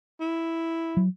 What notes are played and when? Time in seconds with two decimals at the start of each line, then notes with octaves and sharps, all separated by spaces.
0.20 E4
0.97 F#3